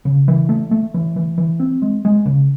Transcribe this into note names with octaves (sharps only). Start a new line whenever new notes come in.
C#3
E3
A3
A3
E3
E3
E3
C4
G#3
G#3
C#3